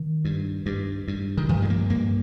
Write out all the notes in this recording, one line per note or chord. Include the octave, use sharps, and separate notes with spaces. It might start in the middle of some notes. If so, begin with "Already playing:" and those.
Already playing: D#3
G2
G2
G2
D#3
G2 F3
G#3
A#3
G2 A#3